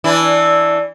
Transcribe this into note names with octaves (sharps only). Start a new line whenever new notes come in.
E3 D4 E4